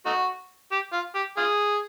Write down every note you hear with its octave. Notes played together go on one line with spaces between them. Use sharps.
A3 D#4 F#4
G4
F4
G4
F4 G#4